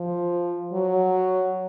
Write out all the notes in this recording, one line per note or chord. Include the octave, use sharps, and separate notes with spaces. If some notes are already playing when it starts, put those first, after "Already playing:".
Already playing: F3
F#3